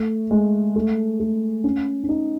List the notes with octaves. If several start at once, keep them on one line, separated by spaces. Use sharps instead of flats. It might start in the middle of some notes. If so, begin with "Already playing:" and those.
Already playing: A3
G#3
A3
A3
C#4
C#4
D#4